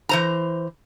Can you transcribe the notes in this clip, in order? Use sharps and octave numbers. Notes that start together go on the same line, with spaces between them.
E3 C5 A#5